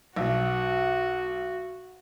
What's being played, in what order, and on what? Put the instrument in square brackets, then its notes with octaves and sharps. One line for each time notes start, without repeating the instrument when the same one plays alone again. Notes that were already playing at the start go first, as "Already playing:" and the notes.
[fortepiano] B1 [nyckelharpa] F#4